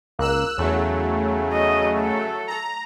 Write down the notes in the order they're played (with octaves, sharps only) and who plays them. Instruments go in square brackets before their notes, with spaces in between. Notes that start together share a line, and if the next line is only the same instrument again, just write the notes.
[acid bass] C#2 [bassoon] A#3 [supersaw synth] E6 F#6
[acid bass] E2 [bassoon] C#3 [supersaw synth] F#3 A3
[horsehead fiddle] D#5
A4
[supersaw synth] A#5